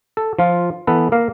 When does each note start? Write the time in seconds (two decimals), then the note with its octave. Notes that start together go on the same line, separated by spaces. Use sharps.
0.17 A4
0.39 F3 F4
0.87 E3 B3 A4 B4
1.12 A#3 A#4 F5